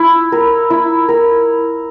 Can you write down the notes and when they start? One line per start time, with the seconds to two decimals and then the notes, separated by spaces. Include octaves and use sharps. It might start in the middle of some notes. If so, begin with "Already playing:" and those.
Already playing: E4
0.32 A#4
0.70 E4
1.09 A#4